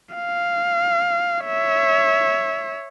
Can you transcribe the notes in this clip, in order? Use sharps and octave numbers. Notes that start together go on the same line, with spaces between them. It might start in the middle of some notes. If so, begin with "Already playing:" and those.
F5
C#5 E5